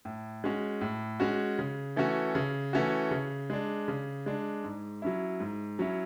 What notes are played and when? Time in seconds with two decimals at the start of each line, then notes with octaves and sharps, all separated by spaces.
0.05 A2
0.44 G#3 C#4 F#4
0.81 A2
1.20 G#3 C#4 F#4
1.59 C#3
1.96 E3 A3 C#4 F#4
2.35 C#3
2.73 E3 A3 C#4 F#4
3.11 C#3
3.50 G#3 D4
3.88 C#3
4.26 G#3 D4
4.64 G#2
5.02 F#3 C#4 E4
5.40 G#2
5.79 F#3 C#4 E4